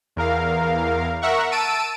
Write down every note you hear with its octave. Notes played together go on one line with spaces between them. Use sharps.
E2 A#4 F5
A#4 E5 F#5 C#6
A5 E6 D7 D#7